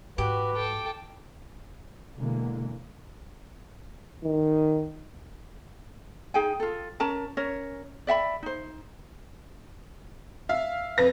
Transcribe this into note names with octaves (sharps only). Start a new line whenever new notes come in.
G#2 F#4 G4 B4
A4 G5
B2 D3 E3 G#3 A#3
D#3
D#4 G#4 G5 G#5
F4 A4
C#4 A#4 A5 A#5
C#4 A#4 C#5
D5 E5 F#5 B5
D#4 C5
E5 F5
F2 B4 A#6